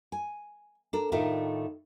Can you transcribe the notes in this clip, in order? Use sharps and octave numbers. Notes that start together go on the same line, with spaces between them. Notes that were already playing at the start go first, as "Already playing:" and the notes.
G#5
D4 A4 A#4
A2 D#3 A3 D4 F4 A#4